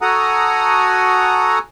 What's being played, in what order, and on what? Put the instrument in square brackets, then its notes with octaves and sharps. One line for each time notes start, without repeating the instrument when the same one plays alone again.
[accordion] F#4 A4 F#5 G#5 A#5 D#6